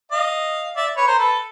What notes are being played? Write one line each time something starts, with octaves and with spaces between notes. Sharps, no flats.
D#5 F5
D5 E5
B4 C#5
A#4 C5
A4 B4